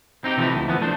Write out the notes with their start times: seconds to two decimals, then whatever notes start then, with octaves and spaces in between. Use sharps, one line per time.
0.24 C4 D#4 F4 G4
0.37 C3 E3 F3 A3 D#4 E4
0.54 D2
0.68 E3 F3 B3
0.82 A3 D4 C5